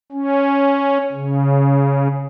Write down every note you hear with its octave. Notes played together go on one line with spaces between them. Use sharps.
C#4
C#3